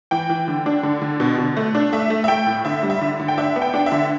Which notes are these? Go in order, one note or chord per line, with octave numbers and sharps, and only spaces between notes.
E3 G5
E3
D3
D4
D3
D3
B2
B2
A3
D4
A3 E5
A3
E5
A3 G5
A2
D3 E5
G3
E5
D3
D3
G5
D4 E5
B3
G5
D4 G5
E5
D3